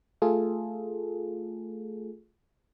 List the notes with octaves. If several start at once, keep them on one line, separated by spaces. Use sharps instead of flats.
A3 F4 G#4 A4